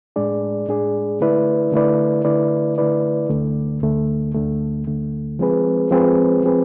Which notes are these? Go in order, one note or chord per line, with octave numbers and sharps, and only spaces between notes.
A2 G#3 D4 G#4 D5
A2 G#3 D4 G#4 D5
D3 A3 E4 B4 D5
D3 A3 E4 B4 D5
D3 A3 E4 B4 D5
D3 A3 E4 B4 D5
D2 D3 A3
D2 D3 A3
D2 D3 A3
D2 D3 A3
F3 G#3 C4 G#4 B4
F3 G#3 C4 G#4 B4
F3 G#3 C4 G#4 B4